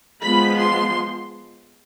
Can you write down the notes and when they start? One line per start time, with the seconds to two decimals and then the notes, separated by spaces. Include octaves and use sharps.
0.22 F3 G#3 B3 B5
0.59 C6